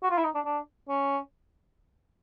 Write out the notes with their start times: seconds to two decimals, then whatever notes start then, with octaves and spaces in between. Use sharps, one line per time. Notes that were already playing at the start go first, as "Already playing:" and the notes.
0.03 F#4
0.11 F4
0.18 E4
0.24 D#4
0.35 D4
0.45 D4
0.89 C#4